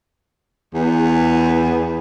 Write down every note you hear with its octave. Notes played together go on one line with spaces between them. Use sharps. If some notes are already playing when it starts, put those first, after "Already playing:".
E2